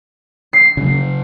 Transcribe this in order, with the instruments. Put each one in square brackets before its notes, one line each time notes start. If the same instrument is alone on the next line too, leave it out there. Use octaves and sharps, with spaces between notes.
[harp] C7
[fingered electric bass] C#3 F#3